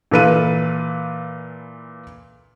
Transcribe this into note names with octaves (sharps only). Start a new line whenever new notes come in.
A#2 E3 A4 B4 F5 D#7